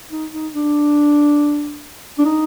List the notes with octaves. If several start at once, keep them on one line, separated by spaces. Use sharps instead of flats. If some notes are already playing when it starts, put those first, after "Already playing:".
D#4
D#4
D4
D4
D#4